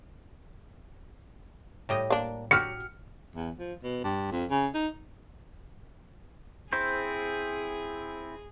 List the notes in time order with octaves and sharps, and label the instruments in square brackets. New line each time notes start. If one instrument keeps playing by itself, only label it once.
[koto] A2 G3 D#5
[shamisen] A#3 D4
[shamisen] F#3 [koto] F#4 G4 [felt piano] F6 C#7
[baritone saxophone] E2
F3
B2
G2
F2
C#3
D#4
[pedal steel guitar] C4 E4 C5 [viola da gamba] G#4